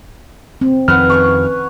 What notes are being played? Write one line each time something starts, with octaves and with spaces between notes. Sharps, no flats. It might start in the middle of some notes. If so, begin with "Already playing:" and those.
C4
F2 D#3 B4 F#5 F6
C#4 C#5 C#6